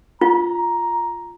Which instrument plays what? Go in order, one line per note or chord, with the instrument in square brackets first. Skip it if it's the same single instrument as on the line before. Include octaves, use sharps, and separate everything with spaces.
[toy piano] F4 [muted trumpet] A#5